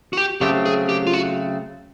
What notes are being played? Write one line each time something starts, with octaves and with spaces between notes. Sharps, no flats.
F#4
G4
C#3 F#3 A3 C4 G4
G#4
G4
F4
F#4